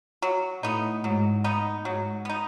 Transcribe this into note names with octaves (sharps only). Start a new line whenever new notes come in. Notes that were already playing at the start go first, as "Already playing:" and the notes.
F#3
A2 B3 D#4
G#2 F#3
B3 D#4
G#2 F#3
B3 D#4